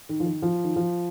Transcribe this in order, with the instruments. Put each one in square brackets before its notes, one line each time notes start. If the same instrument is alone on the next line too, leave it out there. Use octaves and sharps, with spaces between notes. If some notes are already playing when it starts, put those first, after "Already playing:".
[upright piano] D#3
F3
D#3
F3
D#3
F3